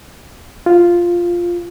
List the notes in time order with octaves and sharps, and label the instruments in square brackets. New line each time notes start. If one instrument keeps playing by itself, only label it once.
[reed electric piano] F4